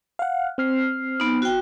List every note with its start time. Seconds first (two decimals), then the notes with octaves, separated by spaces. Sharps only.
0.19 F5 F#5
0.58 C4 F6 C7
1.20 B3 D#4
1.42 F#4 G5